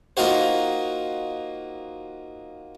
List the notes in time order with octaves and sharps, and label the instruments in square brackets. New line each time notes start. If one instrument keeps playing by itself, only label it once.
[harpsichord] A#3 D#4 F4 F#4 C5